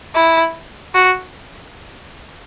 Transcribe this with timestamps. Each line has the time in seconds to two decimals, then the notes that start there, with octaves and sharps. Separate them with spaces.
0.15 E4
0.94 F#4